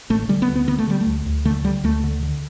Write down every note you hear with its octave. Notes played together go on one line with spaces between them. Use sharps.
A1 A3
D3 G3
B3
D2
B3
D3 B3
A3
D3 G3
A3
D2
D2
D3 A3
D3 G3
D2 A3
D3
D3